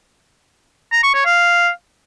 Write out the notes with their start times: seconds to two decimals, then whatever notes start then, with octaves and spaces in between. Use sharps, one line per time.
0.92 A#5
1.03 C#6
1.15 C#5
1.26 F5